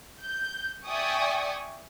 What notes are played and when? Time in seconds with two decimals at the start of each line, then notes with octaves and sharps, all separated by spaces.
0.22 G6
0.87 D5 E5 G5 G#5 C#6 D#6